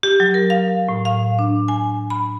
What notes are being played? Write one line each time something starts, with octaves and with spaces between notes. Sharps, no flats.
G4
F#3
A#4
F5
A2
F5
D4
G#5
B5